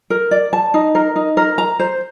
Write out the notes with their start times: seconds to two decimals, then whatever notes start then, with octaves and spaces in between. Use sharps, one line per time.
0.10 A#4
0.31 D5
0.53 A5
0.74 D#4
0.95 A#4
1.16 D#4
1.37 A#4
1.58 A#5
1.79 C5